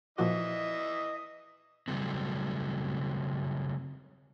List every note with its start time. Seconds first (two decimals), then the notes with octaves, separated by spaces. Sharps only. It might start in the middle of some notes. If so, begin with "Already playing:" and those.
0.18 A#2 E3 F3 F#4 D#5 E5 D#6
1.88 C#3 F#3 G3 A3 C4